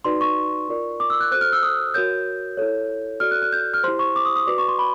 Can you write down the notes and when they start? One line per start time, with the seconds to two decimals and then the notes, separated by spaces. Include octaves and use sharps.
0.05 D#4 F#4 B4 D5 C6
0.21 C#6
0.69 F4 A#4 D5
1.00 D6
1.10 E6
1.20 F#6
1.32 F#4 A4 C5 F#6
1.41 F6
1.53 E6
1.63 D#6
1.94 F#4 A#4 C#5 G6
2.57 E4 A4 C#5
3.20 F#4 A4 D5 F6
3.31 F#6
3.42 F#6
3.52 G6
3.74 F6
3.83 E4 G4 C5 C6
3.99 C#6
4.16 D6
4.26 D#6
4.36 D#6
4.47 F#4 B4 D5 D6
4.58 C#6
4.68 C6
4.79 B5